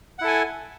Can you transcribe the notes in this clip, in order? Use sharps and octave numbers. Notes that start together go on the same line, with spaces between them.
E4 A4 F#5 G#5